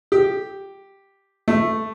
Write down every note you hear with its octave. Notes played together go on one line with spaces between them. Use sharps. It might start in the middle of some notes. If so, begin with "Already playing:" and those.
G4
A3